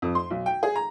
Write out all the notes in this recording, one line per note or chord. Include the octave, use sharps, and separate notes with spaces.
F2
C6
B1
G5
G#4
A#5